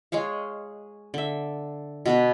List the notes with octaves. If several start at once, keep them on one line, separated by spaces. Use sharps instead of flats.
G#3 G#4 C#5 F5
D3 E5
B2 B3 B4